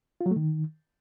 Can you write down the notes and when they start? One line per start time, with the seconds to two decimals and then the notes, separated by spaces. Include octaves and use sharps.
0.21 F4
0.26 F#3
0.31 A3
0.36 D#3